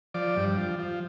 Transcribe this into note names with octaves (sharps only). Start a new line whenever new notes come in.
F3 D5
G2
F3
F3